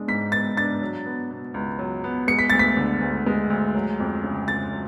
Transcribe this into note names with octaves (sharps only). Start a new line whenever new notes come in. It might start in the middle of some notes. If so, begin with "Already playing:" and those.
Already playing: G#3 B3 D4
G#2 B6
B3 A6
D4 A6
F#3
B3
B2
C#2
F#3
B3
G#3 C#7
B6
D2 A6
B6
D3
D2
G#3
D2
F#3
F2
C#3
F2 A6
F#3